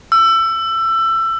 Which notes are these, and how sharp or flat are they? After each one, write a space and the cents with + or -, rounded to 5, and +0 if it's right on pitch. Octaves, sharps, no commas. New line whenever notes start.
E6 +20